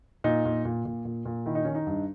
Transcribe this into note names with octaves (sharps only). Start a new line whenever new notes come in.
A#2 D#4
A#2
A#2
A#2
A#2
A#2
D#3 E4
D#4
D#3 C#4
D#4
G2